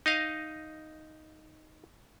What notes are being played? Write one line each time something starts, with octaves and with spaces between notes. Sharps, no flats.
D#4 D#5 F5